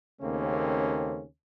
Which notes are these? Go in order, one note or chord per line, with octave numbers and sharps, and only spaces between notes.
D#2 C#3 A3 A#3 C4 C#4